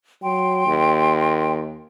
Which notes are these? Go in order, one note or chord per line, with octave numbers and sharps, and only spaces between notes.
F#3 G5 C6
D#2